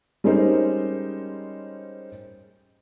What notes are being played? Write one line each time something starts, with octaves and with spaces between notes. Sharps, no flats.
G3 G#3 C#4 D#4 A#4 C5